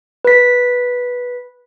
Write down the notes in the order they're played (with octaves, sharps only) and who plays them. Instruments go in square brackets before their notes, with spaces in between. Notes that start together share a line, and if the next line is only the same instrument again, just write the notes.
[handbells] B4 B6